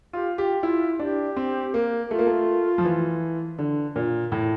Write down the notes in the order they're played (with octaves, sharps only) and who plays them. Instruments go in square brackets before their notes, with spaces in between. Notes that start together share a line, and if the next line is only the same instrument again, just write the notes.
[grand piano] F4 [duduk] G4
[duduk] F4 [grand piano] G4
[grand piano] E4 [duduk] F4
[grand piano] D4 [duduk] G4
[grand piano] C4
A#3
[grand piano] A3 [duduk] F4
[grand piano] A#3
A3
F3
E3
D3
A#2
A2